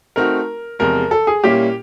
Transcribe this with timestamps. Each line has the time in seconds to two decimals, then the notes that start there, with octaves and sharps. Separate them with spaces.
0.16 A3 C4 D#4 F#4 A#4
0.79 E2 C3 F3 G#3 A#4
1.11 A4
1.27 G#4
1.43 A#2 G3 A#3 C#4 E4 G4